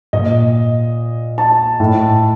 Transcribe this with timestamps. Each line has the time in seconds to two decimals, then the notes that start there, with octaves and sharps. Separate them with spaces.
0.13 A#2 D#5
1.38 A5
1.80 A2